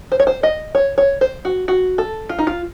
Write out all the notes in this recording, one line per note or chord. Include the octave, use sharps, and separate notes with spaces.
C5
C#5
C5
D#5
C#5
C#5
C5
F#4
F#4
A4
F4
D#4
F4